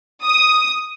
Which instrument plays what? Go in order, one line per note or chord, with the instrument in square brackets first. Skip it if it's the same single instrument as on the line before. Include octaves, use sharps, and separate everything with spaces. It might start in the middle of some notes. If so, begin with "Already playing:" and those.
[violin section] D#6